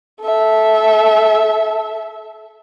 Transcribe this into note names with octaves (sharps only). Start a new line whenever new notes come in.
A4 E5